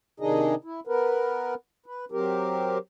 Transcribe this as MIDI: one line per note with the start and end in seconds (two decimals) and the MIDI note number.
0.20 0.55 48
0.20 0.55 51
0.20 0.55 62
0.20 0.55 63
0.20 0.55 68
0.20 0.55 75
0.64 0.80 64
0.87 1.55 59
0.87 1.55 70
0.87 1.55 71
1.86 2.05 71
2.12 2.78 54
2.12 2.78 60
2.12 2.78 67
2.12 2.78 70